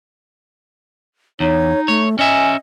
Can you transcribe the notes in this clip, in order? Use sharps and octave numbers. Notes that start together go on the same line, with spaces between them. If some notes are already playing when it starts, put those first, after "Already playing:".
E2 D#4 C#5
A3 C#5
C#4 D#5 E5 G#5